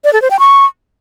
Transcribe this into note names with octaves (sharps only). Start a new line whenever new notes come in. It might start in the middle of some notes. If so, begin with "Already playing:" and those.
D5
A4
C5
G5
C#6